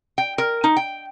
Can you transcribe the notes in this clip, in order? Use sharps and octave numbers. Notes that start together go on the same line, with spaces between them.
G5
A#4
D#4
G5